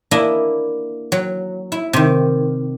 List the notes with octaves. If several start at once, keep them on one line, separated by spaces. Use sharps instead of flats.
A#3 D4 E4 D#5
F#3
E4
C3 D#3